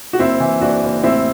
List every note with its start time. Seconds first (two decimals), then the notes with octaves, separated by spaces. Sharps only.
0.13 F#4
0.19 F#1 C4 E4
0.40 E3
0.61 F#1 D4 F#4
0.83 F#1
1.03 A1 C4 E4